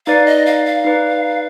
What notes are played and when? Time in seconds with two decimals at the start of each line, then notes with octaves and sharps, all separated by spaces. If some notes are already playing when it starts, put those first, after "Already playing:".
0.06 D#4 B4 D5 F5
0.26 D#5
0.46 F5
0.66 F5
0.85 D#4 B4 D5